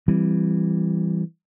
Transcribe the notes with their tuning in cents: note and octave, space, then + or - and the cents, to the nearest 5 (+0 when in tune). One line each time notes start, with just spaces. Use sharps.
E3 +10 G3 +0 C4 +0